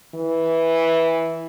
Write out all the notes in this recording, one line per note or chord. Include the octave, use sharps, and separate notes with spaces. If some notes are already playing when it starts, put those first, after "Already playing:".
E3